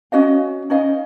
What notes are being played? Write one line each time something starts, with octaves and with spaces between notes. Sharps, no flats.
C#4 F#4 D#5 F5
C#4 D#4 D#5 F5